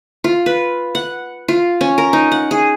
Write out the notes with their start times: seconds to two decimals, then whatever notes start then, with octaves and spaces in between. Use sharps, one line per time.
0.24 F4
0.46 B4
0.95 F#5
1.48 F4
1.81 C#4
1.98 A#4
2.13 D#4
2.32 F#5
2.51 G#4